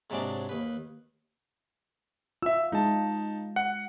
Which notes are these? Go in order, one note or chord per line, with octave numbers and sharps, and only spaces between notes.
G#2 C3 F#3 G#3 D4 D6
D#2 B4
F4 E5 E6
G#3 D#4 F4 A5
F#5